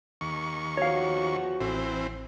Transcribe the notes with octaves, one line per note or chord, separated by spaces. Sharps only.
D#2 C#6
E2 F3 F#4 C#5 F5
A1 E3 C4